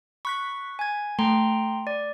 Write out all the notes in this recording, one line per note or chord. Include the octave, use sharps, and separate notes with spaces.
B5 C#6 F#6 B6
G#5 G#6
A3 G5 A#5 C6
D5